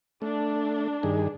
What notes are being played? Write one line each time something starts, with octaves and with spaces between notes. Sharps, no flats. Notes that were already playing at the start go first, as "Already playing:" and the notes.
A3 D4
G2 D#3 G#4